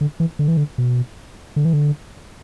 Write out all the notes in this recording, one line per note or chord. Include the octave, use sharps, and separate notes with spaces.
D3
E3
D3
E3
D3
B2
D3
E3
D3